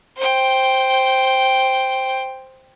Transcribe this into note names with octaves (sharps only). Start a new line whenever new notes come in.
C5 G5